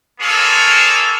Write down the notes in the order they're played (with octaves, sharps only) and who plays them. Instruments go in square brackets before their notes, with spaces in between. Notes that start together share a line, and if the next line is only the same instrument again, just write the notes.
[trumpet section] A#3 F4 G#4 A4 C#5